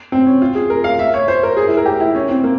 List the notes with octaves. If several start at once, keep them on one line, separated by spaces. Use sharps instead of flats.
C4
C#4
F4
G#4
A#4
F5
E5
C#5
C5
A#4
G#4
E4
A#4
G4
E4
C#4
C4
A#3